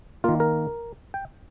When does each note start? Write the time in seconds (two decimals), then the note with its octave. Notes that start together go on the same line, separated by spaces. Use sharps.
0.24 D#3 A#3 F4
0.40 A#4
1.14 G5